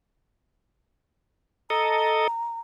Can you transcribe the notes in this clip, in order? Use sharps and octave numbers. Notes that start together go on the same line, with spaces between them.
A4 D#5 A#5